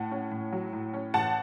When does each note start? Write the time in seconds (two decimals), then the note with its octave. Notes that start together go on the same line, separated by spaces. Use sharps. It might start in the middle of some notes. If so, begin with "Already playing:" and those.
Already playing: A2 F#5 A5
0.11 C#4
0.31 A2
0.52 F#3
0.73 A2
0.94 C#4
1.14 A1 F#5 A5